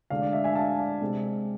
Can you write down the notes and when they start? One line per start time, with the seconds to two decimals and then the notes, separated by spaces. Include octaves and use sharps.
0.10 D2 D3 G#3 D4 D5 F5
0.22 D5
0.33 E5
0.44 E5 G#5
0.55 F5 A5
0.79 D5
1.01 C3 G#3 C4